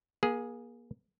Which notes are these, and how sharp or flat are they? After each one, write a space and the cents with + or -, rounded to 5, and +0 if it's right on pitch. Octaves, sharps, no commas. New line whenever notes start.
A#3 +35 G#4 +0